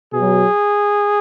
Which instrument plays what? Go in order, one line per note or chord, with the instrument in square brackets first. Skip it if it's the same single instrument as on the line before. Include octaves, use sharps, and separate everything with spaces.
[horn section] B2 F#3 G#4